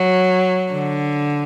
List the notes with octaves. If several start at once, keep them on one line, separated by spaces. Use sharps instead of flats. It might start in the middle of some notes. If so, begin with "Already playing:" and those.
Already playing: F#3
D3